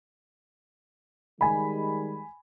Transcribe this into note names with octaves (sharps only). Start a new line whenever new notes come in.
D#3 G3 G#3 G#5 B5